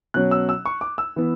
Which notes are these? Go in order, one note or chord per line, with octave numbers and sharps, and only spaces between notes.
B2 F#3 C#4 F#6
E6
E6
C#6
D6
E6
E3 B3